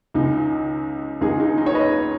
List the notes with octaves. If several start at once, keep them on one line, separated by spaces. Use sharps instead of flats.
C#2 C#3 D#4
C#2 C#3 D#4 G#4
D#4 G#4
D#4
C#5
B4 D#5